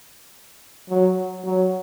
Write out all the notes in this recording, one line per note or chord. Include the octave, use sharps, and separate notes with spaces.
F#3
F#3